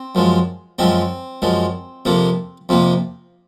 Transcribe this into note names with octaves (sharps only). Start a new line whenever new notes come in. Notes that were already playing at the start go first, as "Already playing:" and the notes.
Already playing: C4
F#2 F3 G#3
F#2 F3 G#3 C4
F#2 F3 G#3
F2 C3 F3 A#3
F2 C3 F3 A#3